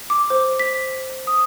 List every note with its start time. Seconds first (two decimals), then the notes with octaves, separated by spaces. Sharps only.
0.10 D6
0.30 C5
0.59 B6
1.27 D#6